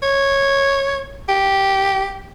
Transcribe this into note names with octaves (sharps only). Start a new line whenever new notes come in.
C#5
G4